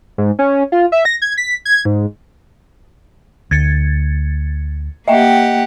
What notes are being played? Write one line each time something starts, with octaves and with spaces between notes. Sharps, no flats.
G#2
C#4
F4
E5
A#6
G#6
B6
G#6
G#2
D2 G#6 A6 C#7
A#3 G4 D#5 E5 F#5 G5